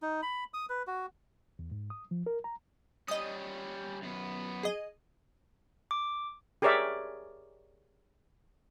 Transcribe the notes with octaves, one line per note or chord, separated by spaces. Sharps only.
D#4
B5
D#6
B4
F#4
E2
G#2
D#6
F3
A#4
A#5
G3 C#4 D#5 D#6
F#2 B3
G#4 D#5
D6
G4 G#4 A#4 C#5 D5 E5